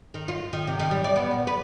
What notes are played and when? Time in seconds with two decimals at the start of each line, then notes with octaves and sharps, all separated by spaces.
0.14 D#3
0.28 F4
0.53 D#3
0.67 C3
0.79 D#3
0.91 G3
1.04 D5
1.16 B3
1.31 A#2
1.47 B4